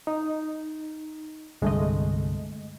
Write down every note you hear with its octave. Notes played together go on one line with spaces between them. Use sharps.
D#4
C2 G2 D3 G#3 A3 D#5